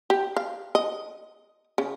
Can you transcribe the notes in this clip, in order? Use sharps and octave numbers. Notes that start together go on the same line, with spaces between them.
G4
F5
D#5
C#3